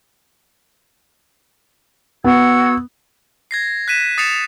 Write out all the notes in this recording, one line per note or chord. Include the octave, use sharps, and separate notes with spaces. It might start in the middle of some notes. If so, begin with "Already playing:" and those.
B3 F#4 E6 G#6
G#6 A#6 C7
F#6 B6 D#7 E7
D#6 A6 C7 C#7 E7 F7